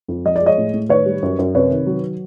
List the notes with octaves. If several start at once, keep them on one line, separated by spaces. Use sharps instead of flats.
F2
F3 D#5
G#3 D5
C#5 D#5
A2
A2
D#3 B4 C#5
G3
F#2
F#2
C3 B4 C#5
D#3
F#3